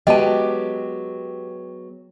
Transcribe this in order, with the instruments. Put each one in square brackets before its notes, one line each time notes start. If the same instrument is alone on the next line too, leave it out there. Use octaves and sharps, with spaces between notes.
[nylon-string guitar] F#3 G#3 B3 [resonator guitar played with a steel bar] G4 [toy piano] D#5 A5